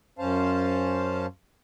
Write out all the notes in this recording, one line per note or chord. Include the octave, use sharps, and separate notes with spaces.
F#2 C#4 C5 F5 A5